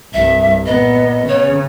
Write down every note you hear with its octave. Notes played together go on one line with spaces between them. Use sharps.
C2 G2 E5
A#2 B3 D#5
C#3 C#5